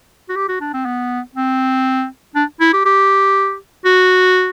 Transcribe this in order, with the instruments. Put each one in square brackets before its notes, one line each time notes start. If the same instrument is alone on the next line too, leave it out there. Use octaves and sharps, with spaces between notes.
[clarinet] F#4
G4
F#4
D4
C4
B3
C4
D4
E4
G4
G4
F#4